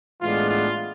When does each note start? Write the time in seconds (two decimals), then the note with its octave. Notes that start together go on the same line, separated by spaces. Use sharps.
0.22 A2 E3 G#3 B3 D4 F4
0.50 F4